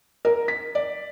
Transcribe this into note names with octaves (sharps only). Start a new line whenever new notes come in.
A#4
B6
D5